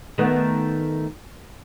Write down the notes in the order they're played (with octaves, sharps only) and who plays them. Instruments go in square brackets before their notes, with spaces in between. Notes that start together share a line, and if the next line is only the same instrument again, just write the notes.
[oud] D#3 A3 B3